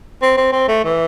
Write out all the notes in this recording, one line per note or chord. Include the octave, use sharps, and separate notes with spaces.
C4
C4
C4
A3
E3